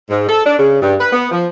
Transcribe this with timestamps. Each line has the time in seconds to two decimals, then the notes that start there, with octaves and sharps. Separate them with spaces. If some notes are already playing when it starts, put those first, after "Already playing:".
0.10 G#2
0.28 A4
0.45 D4
0.58 C#3
0.81 G2
0.99 B4
1.12 B3
1.31 F3